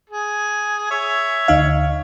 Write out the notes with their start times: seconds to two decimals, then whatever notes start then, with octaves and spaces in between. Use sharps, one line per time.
0.10 G#4
0.91 C#5 E5
1.48 D2 D#4 F5